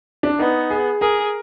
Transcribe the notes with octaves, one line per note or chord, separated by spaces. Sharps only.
D4
B3 D#4
G#4
G#4 A#4